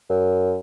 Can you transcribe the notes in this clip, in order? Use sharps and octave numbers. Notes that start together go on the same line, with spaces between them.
F#2